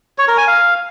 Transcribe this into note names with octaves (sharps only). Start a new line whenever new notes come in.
C#5
A#4
G#5
F5